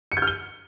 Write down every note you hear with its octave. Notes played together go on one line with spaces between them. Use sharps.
C#7
G6
F6
G7